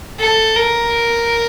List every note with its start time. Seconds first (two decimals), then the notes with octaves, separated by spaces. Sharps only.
0.20 A4
0.56 A#4